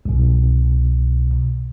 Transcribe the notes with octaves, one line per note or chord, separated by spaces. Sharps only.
C2 B2